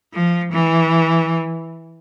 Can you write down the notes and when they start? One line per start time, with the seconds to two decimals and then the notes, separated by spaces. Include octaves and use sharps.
0.13 F3
0.52 E3